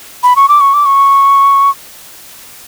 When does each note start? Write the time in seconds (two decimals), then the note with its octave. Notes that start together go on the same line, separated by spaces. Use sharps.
0.23 B5
0.36 C#6
0.49 D6
0.61 C#6
0.74 D6
0.86 C#6